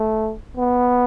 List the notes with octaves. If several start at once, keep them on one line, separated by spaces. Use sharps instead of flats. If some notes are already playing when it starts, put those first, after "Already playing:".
Already playing: A3
B3